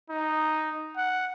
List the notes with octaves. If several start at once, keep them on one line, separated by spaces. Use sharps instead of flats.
D#4
F#5